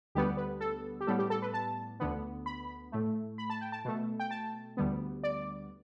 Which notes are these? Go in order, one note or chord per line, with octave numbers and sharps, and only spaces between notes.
D2 D3 G3 B3 G4
B4
A4
G4
A2 G3 B3 A4
G4
A4
B4
A5
D2 D3 B3
B5
A2 A3
B5
A5
G5
A5
B2 A3
G5
A5
D2 D3 G3 B3
D5